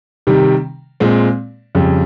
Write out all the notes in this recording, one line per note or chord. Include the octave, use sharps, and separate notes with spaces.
C3 D#3 G3
A#2 G#3 C4
F2 C#3 G3